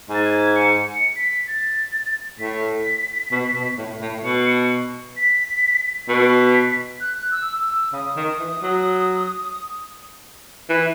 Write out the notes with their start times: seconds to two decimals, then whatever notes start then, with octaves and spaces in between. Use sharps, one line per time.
0.09 G#2
0.15 A6
0.25 G#6
0.56 C#7
0.85 C#7
1.16 B6
1.48 A6
2.39 A2 B6
3.32 B2
3.55 B2
3.78 A2
4.01 A2
4.24 B2 C#7
5.17 B6
6.09 B2 B6
7.01 F#6
7.31 E6
7.62 E6
7.93 C#3 D#6
8.16 D#3
8.40 E3
8.62 F#3
10.69 E3